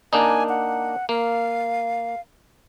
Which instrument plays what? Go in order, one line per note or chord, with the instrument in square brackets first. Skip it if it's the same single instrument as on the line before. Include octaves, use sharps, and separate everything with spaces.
[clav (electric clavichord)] A#3 D4 D#4 [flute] G#5
[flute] F#5
[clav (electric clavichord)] A#3 [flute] F5